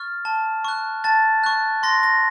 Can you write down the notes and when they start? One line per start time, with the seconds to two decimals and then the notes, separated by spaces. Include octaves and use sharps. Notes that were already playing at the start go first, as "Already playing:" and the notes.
Already playing: C#6 F6 A6
0.25 A5
0.65 C#6 F#6
1.04 A5 A6
1.44 C#6 F#6
1.83 C6 A#6
2.03 A#6